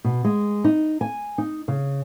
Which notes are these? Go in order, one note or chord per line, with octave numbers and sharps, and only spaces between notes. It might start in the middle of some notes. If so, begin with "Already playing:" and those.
B2
G#3
D#4
G#5
D#4
C#3